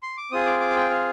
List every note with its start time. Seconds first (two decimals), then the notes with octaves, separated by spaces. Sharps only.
0.03 C6
0.17 D6
0.31 C4 F4 G#4 D#6
0.46 D6
0.60 D6
0.70 F5
0.76 G5
0.90 F5